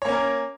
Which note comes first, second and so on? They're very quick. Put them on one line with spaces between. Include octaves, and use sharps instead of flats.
C#5 A#3 C#4 A#4